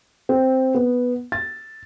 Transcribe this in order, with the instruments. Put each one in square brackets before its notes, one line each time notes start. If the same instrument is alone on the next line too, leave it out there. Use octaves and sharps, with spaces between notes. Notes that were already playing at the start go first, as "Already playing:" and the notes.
[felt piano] C4
B3
A6